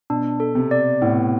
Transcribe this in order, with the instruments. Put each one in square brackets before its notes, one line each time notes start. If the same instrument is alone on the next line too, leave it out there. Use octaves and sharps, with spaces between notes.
[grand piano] B2 [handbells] D4
[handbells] A4
[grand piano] C3
[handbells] D5
[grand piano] A2 [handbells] B3